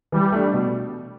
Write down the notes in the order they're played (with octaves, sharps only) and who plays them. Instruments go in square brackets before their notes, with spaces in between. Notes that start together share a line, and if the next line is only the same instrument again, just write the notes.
[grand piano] E3 [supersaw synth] G3
[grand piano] A3 D4
B2